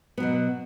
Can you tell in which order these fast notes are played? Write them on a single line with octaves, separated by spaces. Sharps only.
B3 F#3 B2